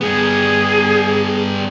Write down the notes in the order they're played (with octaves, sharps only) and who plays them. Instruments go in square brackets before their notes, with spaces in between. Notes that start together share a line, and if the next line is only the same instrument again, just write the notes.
[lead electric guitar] G2 B3 [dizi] G#4